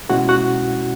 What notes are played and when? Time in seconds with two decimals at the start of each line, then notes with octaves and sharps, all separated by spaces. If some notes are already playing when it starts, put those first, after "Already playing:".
0.09 B2 G#3 C#4 E4 F#4 F#5
0.29 F#4 F#5